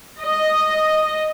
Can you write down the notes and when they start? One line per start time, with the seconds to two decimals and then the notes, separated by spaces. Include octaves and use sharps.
0.20 D#5